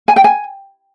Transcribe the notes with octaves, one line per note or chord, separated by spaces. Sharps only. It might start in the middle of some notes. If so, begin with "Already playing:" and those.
G#5
G5
G#5